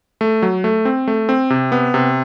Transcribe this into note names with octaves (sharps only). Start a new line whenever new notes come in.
A3
F#3
A3
C4
A3
C4
C3
B3
C3